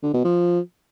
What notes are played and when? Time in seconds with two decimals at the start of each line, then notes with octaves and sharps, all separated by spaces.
0.03 D3
0.14 B2
0.25 F3